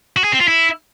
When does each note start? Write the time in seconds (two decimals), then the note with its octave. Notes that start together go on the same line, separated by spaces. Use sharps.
0.16 F#4
0.24 G#4
0.32 C4
0.40 F4
0.48 E4